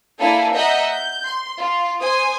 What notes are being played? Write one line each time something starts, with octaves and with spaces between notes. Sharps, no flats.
A#3 D4 E4 A4 F5 G#5
D#5 E5 F#5 A#5 G6
G6
C6
F4
C5 G#5 D#6